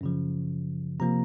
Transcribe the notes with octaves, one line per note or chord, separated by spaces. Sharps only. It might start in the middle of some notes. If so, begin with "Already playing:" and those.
F#2 C#3 F3
C3 F3 A#3 A#5